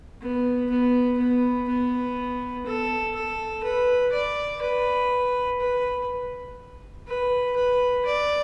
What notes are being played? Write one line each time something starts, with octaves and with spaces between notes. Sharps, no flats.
B3
B3
B3
B3
A4
A4
B4
D5
B4
B4
B4
B4
D5